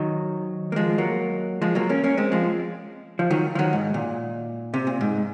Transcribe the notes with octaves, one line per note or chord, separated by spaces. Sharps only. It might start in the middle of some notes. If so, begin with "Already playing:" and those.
Already playing: D#3 F#3
A#3
F3 G#3
F#3 A#3
F3 G#3
F#3 A#3
A#3 C#4
A#3 C#4
G#3 C4
F3 G#3
F3
D#3 F#3
F3
D#3 F#3
G#2
A#2
C3
A#2
G#2